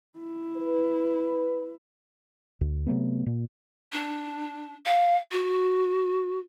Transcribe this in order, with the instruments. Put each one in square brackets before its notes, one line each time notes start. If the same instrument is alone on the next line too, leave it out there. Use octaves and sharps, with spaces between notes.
[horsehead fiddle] E4
[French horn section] B4
[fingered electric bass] D2
C3 F#3 A3 B3
A#2
[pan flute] D4
F5
F#4